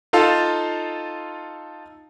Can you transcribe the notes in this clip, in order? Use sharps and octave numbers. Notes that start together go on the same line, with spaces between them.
D#4 F4 A4 F5 A5